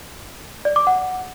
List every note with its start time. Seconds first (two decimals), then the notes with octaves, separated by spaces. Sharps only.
0.65 D5
0.76 D6
0.87 F#5